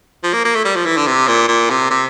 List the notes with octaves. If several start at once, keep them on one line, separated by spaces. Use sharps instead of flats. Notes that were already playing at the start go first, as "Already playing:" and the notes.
F3
A#3
A#3
A3
G3
F3
E3
D3
C3
A#2
A#2
C3
C3